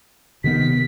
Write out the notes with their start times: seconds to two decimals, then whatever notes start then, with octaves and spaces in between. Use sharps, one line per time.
0.44 C3 D#3 B3 B6